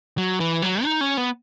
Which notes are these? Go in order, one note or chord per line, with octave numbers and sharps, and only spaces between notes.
F#3
E3
F#3
D#4
C#4
B3